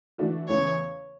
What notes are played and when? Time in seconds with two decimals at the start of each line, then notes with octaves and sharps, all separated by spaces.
0.18 E3 A3 D4 F#4 A4
0.48 E2 C#3 E3 A3 C#5